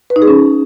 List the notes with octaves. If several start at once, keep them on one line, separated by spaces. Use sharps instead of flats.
B4
D#4
G#4
C#4